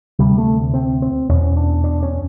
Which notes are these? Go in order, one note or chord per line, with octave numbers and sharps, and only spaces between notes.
D2 C3 G3
A3
C4
C4
E2 B2 C#4
D4
D4
C#4